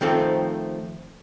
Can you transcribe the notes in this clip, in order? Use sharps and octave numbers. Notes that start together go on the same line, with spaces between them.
D#3 F3 A3 C4 A4